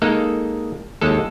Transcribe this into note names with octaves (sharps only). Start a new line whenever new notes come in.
G#3 A#3 D#4 A4
D#2 G#3 A4